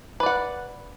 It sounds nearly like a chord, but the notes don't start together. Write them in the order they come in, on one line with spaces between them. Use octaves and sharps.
B4 D5 F#5